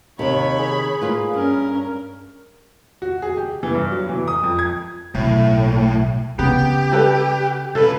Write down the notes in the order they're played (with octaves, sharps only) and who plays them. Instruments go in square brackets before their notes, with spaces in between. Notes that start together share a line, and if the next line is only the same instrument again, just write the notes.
[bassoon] D#2 [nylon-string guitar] C3 D#3 [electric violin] C#5 B5
[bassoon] G#4
[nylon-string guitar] A#3 F4 B4
[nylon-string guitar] G2 [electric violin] C#4 A#4
[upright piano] F#4
G#4
G4
E3
G2
F#3
E3
D#6
F2
G#6
[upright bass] B1 [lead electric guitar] A2
[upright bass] C#3 [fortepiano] B3 [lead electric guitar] G4
[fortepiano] G3 A4 B4
[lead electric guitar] C#2 B4 [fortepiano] A4